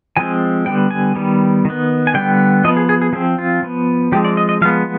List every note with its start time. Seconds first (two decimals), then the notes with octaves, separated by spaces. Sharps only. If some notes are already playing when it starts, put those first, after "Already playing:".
0.17 F3 G#3 C4 G#5
0.66 D3 G3 B3 G5
0.91 G#5
1.15 D#3 G3 B3
1.65 D#3 B3
2.07 G#5
2.14 D3 G3 B3 G5
2.64 F3 D#5
2.68 B3
2.77 G#4
2.89 G#4
3.02 G#4
3.13 F3 C4 G#4
3.38 F4
3.63 F3 B3
4.12 F3 G#3 C4 G4
4.25 D5
4.37 D#5
4.49 D#5
4.61 F3 G#3 B3 F5